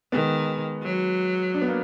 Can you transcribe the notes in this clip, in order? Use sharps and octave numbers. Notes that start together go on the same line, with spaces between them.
D#3 G#3 B3
F#3
D4
B3
A#3